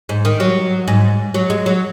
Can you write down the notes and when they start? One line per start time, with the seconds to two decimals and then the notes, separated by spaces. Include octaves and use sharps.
0.09 G#2
0.25 D#3
0.40 F#3
0.88 G#2
1.34 F#3
1.50 G#3
1.66 F#3